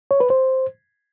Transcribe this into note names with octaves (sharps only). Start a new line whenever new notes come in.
C#5
B4
C5